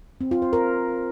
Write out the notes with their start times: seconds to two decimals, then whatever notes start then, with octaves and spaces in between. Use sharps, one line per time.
0.21 C4
0.31 F4
0.42 C5
0.53 A#4